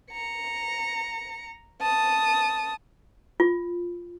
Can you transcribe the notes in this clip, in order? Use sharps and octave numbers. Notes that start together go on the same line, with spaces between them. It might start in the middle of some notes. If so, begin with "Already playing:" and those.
A#5 C#7
A5 D#6
F4